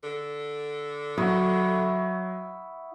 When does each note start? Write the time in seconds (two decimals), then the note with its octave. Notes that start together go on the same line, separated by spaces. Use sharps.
0.04 D3
1.18 F#3 E4 F#5 C#6 D#6